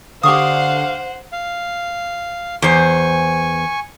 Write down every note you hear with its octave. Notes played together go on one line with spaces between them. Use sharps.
D3 G4 C5 F5 F#5 C#6 D#6
F5
E2 C5 G#5 C#6